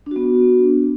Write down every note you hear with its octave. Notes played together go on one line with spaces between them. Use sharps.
B3 D4 F#4